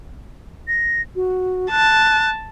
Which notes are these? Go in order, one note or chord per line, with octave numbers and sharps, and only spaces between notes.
A#6
F#4
A5 F#6